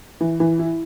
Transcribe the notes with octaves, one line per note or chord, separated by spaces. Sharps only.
E3
E3
E4